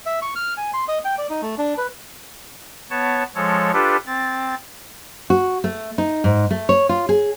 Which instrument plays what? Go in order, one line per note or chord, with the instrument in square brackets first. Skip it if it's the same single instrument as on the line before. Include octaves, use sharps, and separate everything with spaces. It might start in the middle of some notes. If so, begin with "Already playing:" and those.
[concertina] E5
C#6
F6
G#5
C6
D#5
G5
D5
D#4
A3
D4
B4
[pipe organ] B3 C#5 A5
F3 G#3 A4 C#5
D4 F4 G4 A4 B4
C4 A6
[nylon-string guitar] F#4
A3
D#4
G#2
A3
C#5
F4
G#4